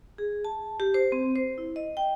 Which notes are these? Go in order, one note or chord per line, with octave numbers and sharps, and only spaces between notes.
G#4
A5
G4
C5
C4
C5
E4
D#5
G5